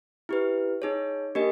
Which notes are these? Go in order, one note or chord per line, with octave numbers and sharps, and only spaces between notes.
E4 G4 B4
D#4 G#4 C#5
A#3 D4 G4 A#4 D#5